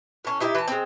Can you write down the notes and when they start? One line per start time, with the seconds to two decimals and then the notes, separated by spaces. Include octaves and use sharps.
0.25 A2 C#4
0.40 D#4 E4 G4 E5
0.55 E3 A5
0.68 G#3 C4